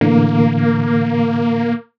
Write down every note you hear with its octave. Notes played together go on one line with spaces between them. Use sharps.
A2 D3 E3 A#3